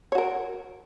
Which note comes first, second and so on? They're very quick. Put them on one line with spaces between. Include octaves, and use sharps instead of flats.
C#5 F#4 A#4